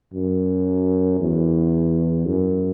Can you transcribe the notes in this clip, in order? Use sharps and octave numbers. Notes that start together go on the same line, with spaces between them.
F#2
E2
F#2